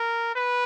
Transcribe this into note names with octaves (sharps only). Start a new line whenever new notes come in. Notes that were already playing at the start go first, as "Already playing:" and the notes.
Already playing: A#4
B4